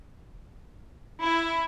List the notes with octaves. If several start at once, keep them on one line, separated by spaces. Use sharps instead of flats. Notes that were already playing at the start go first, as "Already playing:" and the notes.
E4